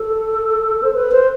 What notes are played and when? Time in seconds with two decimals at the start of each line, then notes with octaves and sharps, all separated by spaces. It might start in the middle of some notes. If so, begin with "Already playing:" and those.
Already playing: A4
0.82 C5
0.94 B4
1.12 C5